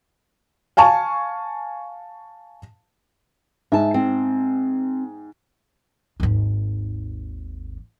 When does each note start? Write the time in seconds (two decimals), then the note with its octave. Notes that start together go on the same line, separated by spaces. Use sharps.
0.77 F5 G#5 A5 C#6
3.72 G#2 E5 A5
3.94 C4
6.20 G#1 D#2